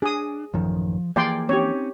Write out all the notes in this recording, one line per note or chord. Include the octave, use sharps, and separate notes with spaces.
D4 G#4 D#6
A1 F#2 D#3 F3
E3 F3 A#3 G#4 D5 G5 G#5 C6
C4 C#4 D#4 G4 C#5